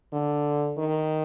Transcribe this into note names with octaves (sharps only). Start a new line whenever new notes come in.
D3
D#3